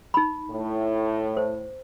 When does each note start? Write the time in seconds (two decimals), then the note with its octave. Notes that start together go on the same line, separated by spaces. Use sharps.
0.14 D#4 B5
0.50 A2
1.37 C5